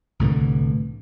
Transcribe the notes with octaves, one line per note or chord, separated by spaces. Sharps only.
C2 A2 D3 E3